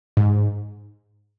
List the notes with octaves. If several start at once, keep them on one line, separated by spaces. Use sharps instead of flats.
G#2